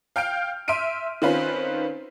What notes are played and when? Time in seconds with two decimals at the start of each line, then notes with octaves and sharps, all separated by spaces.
0.16 F5 G5 F6 G6 D7
0.68 E5 C6 F6 D7 D#7
1.22 D#3 C4 C#4 F4 B4